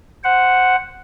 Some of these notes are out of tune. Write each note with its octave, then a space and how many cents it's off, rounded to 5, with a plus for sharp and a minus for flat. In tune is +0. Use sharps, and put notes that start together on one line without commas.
C5 +0 F#5 +0